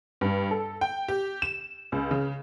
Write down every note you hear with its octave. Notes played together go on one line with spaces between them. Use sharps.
G2
A4
G5
G4
E7
C#2
C#3